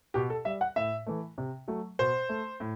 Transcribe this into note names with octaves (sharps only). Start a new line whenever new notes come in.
B2 G4
A4
G3 E5
F#5
A2 E5
E3 A3
C3
F#3 A3
B2 C5
A3
A2